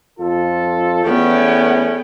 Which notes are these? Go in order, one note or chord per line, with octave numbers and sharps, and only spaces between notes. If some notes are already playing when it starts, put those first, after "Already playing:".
F2 F4 A4
E2 A3 B3 C#4 G5